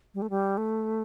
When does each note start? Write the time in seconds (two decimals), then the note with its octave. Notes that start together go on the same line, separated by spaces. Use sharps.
0.14 G3
0.22 A3
0.30 G3
0.57 A3